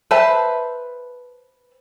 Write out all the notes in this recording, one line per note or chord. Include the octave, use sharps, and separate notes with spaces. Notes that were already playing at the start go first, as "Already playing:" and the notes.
B4 C5 E5 A5